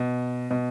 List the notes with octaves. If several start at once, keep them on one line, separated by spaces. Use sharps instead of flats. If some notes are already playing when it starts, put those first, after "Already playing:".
Already playing: B2
B2